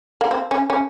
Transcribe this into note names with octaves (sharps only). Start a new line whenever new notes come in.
A#3
C4
C#4
C#4